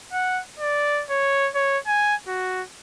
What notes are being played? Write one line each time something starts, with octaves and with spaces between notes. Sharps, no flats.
F#5
D5
C#5
C#5
G#5
F#4